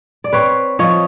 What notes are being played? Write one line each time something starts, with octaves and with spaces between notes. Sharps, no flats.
D5
C4 B4 C#5
F3 C#5 D#5